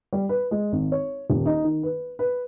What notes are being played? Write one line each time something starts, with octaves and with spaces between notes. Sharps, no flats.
G3
B4
G#3
G#1
C#5
D#1
D#4
D#3
B4
B4